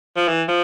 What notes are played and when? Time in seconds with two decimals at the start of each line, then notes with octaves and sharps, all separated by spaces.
0.17 F3
0.28 E3
0.48 F3